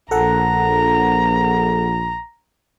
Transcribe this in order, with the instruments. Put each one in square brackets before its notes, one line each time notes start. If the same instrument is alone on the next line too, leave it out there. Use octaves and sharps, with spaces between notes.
[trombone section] A#1 [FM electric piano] A4 F#5 [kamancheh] A#5